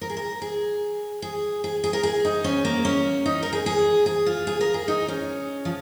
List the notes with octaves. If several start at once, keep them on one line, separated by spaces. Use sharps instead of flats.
A#4
G#4
A#4
G#4
G#4
G#4
G#4
A#4
G#4
D#4
C#4
A#3
C#4
D#4
A#4
G#4
G#4
G#4
F4
G#4
A#4
G#4
D#4
C#4
F3